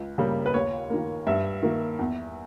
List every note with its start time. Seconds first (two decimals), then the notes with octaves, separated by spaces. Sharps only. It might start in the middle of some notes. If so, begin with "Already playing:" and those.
Already playing: C#2
0.18 C#3 G3 A#3
0.46 B4
0.54 D#2 C#5
0.90 D#3 A#3
1.27 G2 E5
1.63 D#3 A#3
1.99 E2